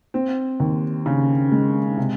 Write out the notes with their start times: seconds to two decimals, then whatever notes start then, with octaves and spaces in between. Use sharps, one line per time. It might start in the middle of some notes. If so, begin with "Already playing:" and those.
0.14 C4
0.60 D#2
1.06 C#3
1.52 G#3
1.97 C3